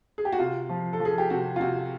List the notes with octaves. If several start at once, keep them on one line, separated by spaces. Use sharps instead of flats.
G#4
G4
F#4
C3 F4
F3
A4
F3
G#4
G4
C3 F#4
F4
C3 F#4